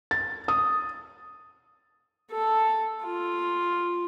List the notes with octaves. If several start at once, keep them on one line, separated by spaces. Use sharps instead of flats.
A6
D#6
A4
F4